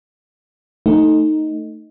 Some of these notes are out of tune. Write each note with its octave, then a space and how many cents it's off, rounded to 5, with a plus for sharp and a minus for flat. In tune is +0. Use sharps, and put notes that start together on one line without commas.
A3 +15 D#4 +0